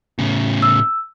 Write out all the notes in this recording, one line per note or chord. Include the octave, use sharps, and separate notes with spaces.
A2 C#3
E6